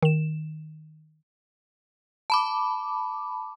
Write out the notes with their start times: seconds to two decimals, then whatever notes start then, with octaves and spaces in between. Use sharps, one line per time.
0.02 D#3 E7
2.30 A5 B5 D6